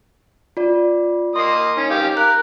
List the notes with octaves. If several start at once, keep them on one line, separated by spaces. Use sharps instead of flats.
F4 D5
A#3 D#5 C6 D#6 C7
C#4 D#4
G4 F5
A#4 F#6